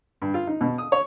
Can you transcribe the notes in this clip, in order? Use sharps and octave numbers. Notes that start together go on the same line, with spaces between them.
G2
F4
D#4
B2
D#6
C#5